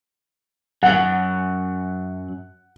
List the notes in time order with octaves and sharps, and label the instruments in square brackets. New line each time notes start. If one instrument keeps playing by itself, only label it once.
[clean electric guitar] F#2 F#3 [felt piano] F#5